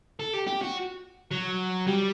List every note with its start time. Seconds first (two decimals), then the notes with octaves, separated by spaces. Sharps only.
0.19 A4
0.33 G4
0.47 G4
0.61 F#4
1.31 F#3
1.87 G3